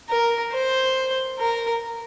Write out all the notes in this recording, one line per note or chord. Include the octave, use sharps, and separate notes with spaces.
A#4
C5
A#4